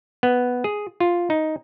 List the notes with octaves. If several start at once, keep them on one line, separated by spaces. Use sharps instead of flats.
B3
G#4
F4
D#4